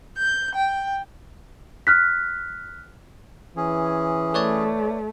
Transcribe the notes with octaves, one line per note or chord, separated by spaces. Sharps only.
G6
G5
F6 F#6 B6
E3 C#4 G#4
A3 B4 C#5 D5